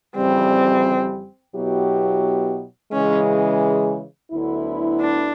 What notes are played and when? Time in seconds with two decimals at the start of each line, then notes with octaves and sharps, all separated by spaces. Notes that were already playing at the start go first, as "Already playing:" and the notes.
0.16 F2 C#3 E3 G3 C4
1.54 B2 F#3 B3 E4 G4
2.92 C#3 E3 G#3 C#4
4.31 D2 D3 F#3 B3 E4
5.01 D4